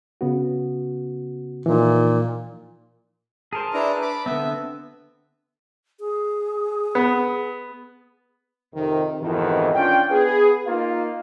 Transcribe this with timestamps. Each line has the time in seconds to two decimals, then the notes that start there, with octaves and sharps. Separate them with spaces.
0.21 C#3 B3 F#4
1.66 A#2 E3 F3 D#4
3.53 G#4 A#4 C5 A5
3.74 D4 E4 B4 A#5
4.02 B5 D6
4.26 D3 B3 C4 E5
6.00 G#4
6.95 B3
8.75 F2 C3 D#3
9.21 F2 G#2 B2 D#3 E3
9.75 C#4 D4 F4 G5
10.10 B3 G#4 B4
10.66 A#3 D#4 F4 F5